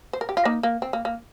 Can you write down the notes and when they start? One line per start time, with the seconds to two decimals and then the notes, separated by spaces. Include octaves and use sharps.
0.13 C5
0.21 A#4
0.29 G4
0.37 F4
0.45 A#3 D#4
0.63 A#3
0.82 C4
0.93 A#3
1.05 A#3